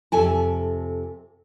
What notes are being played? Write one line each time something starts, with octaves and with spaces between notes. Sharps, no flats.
F2 C3 A4 G#5 A5